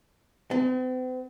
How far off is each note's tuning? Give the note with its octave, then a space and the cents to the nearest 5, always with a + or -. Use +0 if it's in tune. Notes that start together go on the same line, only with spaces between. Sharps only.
C4 -45